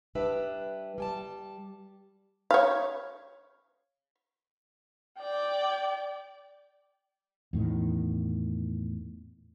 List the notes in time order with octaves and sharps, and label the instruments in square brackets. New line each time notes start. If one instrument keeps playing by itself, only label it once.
[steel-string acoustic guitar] G3 D4 B4 E5
G3 G#5 A5
[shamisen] C#5 F5
[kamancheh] D5 G5
[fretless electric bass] E2 A2 D#3